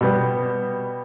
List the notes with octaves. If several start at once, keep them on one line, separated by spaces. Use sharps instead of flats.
B2 G3 B3